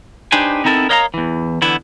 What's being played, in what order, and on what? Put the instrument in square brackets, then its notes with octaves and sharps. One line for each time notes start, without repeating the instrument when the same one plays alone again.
[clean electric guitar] D4 D#4 G4 B4 C5 G#5
B3 C4 D#4 E4 A4 A#4
A#4 C#5 D#5 F5 F#5 A#5
E2 E3
D3 E3 B3 E4